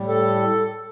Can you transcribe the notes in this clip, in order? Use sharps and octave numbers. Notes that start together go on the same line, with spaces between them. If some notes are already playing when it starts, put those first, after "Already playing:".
Already playing: A2 G3
A4